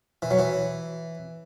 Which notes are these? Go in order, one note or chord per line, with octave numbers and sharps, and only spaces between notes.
E3
F#3
E3